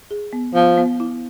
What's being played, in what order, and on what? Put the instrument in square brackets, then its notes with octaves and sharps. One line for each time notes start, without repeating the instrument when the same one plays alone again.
[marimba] G#4
B3
[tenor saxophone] F3 [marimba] B3
[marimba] B3
E4